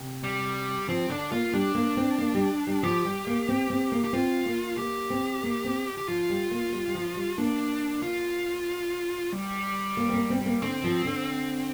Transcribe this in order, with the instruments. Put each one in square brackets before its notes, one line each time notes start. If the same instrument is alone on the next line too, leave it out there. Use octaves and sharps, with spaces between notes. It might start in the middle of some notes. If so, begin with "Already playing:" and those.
Already playing: [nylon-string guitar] C3
[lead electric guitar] G3
[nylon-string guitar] F3 [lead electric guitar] C4
[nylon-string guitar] D3 [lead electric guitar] D4
[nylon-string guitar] A#3 [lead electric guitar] F4
[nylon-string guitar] G3 [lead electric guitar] D4
[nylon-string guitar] A#3
C4
A#3
G3
G3
[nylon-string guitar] F3 [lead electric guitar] G4
[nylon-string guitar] G3
A#3
C4
C4
A#3
[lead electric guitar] G4
[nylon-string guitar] C4 [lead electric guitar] F4
[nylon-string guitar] A#3
[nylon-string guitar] A#3 [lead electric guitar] G4
[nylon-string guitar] C4
A#3
C4
[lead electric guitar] G4
[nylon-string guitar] F3 [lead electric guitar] F4
[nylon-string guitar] G3
A#3
G3
G3
F3
G3
[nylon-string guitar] A#3 [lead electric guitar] D4
[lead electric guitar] F4
G3
[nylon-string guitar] A#3
C4
A#3
C4
C4
A#3
[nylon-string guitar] D3 [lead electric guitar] C4
[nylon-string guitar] F3
D3